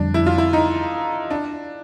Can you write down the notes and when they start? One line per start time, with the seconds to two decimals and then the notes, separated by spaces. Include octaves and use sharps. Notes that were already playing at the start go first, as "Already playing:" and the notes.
Already playing: F2 D3 G3 D4
0.14 E4
0.26 F4
0.38 E4
0.53 D#4
1.31 D4